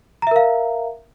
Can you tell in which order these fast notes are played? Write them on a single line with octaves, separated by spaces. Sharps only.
A#5 E5 A#4 F5